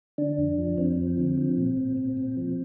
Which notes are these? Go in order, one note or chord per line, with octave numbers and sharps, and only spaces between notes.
D3 D4
F2
F3
F2 C4
F3
D3
F3
A#2
A#2
A#2
A#2
F3